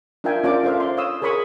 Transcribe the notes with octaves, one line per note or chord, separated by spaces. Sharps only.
D4 F4 A#4 E5 G5 G#5
C#4 D4 F4 A#4 D5 D6
D4 F4 A4 C5 E5 F5
C6
C#5 F5 C6 D#6 E6
G#4 A#4 C#5 B5 C#6 D#6